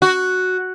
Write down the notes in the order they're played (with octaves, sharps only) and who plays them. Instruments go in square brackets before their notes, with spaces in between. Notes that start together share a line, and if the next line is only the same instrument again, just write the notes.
[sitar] F#4